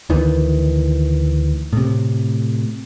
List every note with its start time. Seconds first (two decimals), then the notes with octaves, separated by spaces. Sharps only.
0.10 D2 D#3 E3
1.73 A2 C3